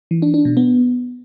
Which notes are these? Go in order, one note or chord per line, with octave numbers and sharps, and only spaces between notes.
E3
D4
D4
B2
B3